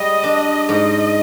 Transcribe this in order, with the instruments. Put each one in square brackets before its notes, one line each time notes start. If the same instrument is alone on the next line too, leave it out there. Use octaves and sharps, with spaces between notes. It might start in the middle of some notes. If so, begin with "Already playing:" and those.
Already playing: [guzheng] G3 G#4 [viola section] D#5
[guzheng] D4
[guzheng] G#2 [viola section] D#5